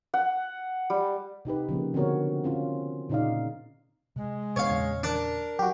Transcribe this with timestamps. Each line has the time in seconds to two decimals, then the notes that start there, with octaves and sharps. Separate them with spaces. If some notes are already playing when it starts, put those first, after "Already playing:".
0.14 F#5
0.90 G3
1.45 C3 D#4 G4 B4
1.69 C#3 F3 A#3
1.94 D3 B3 C4 F#4 A#4 C#5
2.44 C4 C#4 F4
3.09 A#2 C#3 D#4 D5 F5
4.16 C3 G#3
4.56 C3 B3 D4 C#5 F5
4.70 E2 A#2 C#3
5.03 D4 A#4
5.59 F#3 F#4 G4